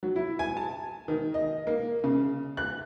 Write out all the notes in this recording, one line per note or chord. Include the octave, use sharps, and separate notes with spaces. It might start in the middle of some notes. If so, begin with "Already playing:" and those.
F#3
E4
G#5
A5
D#3
D#5
A#3
C#3
F#6